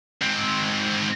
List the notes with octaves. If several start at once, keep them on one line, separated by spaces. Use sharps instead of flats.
G#2 C4